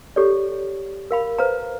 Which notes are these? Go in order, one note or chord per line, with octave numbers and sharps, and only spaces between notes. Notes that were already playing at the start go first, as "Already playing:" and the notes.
G4 A4 C#5 D5
A#4 F5 B5
B4 C5 F5 A#5